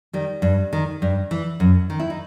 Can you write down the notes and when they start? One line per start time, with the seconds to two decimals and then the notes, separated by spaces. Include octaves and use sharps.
0.13 D#3 G3
0.42 G2
0.73 D#3
1.02 G2
1.31 E3
1.60 F#2
1.90 D#3
2.00 E4
2.10 D#4